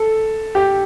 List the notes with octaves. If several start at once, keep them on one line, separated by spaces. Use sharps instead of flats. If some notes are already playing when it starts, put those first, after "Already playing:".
Already playing: A4
G4